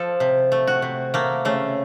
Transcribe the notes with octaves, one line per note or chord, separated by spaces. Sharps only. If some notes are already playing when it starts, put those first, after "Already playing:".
Already playing: F3 A4
C3
A3
F#4
C3
A3 A#3
C#3 A3